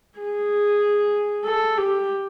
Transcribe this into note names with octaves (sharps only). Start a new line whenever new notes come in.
G#4
A4
G4